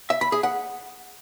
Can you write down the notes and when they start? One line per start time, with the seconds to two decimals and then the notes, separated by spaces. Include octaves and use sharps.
0.10 E5
0.21 B5
0.32 G#4
0.43 F#5